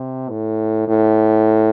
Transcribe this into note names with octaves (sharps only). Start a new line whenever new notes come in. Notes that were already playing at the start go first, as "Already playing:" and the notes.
Already playing: C3
A2
A2